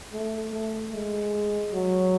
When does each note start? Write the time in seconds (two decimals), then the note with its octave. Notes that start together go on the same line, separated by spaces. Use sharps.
0.13 A3
0.53 A3
0.93 G#3
1.72 F#3